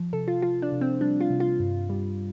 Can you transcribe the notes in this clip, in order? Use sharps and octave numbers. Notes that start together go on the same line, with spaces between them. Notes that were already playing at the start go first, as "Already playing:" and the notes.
Already playing: F3
C3 A4
F4
F3 F4
D4
C3
C4
G3 D4
F4
C3
F4
G2
G3